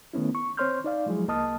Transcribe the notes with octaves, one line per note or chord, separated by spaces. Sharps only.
D#3 A3 B3 C#4 E4
C#6
C4 C5 C#5 C6 F6 G6
D#4 D5 F5
F3 F#3 G#3 E4 G#4
C2 A#3 D#5 A5 D#6 F6